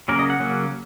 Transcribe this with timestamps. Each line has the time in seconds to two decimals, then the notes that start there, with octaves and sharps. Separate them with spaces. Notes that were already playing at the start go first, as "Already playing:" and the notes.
0.08 C#3 F#3 A#3 C#4 A#4
0.19 D#5
0.30 F#5
0.39 C#3 F#3 A#3 C#4